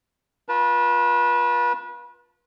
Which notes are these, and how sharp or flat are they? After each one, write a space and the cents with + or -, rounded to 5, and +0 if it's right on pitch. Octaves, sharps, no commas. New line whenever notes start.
F4 +15 B4 -30 A5 +0